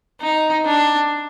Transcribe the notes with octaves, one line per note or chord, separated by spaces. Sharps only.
D#4
D4